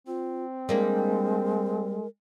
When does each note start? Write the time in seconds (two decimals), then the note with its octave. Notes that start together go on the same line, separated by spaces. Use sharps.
0.07 C4 F4
0.69 G3 G#3 A#3 D4 A#4